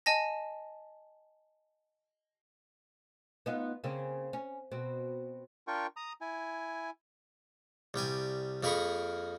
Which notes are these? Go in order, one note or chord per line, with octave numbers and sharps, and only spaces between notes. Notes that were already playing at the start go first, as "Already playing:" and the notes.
D#5 G#5 A5 A#6
B3 D#4 F4
C#3 A#3 C4
C#4
B2 C4
D4 F4 A#4 G5 C#6
A#5 D#6
E4 G#5
C2 G3 G5 G#5
F2 A#3 G#4 A#4 B5 C#6